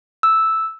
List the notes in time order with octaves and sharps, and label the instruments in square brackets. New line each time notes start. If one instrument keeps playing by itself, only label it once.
[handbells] E6